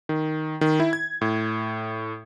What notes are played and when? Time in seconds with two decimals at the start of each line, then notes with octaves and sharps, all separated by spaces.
0.09 D#3
0.61 D#3
0.80 E4
0.93 G#6
1.21 A2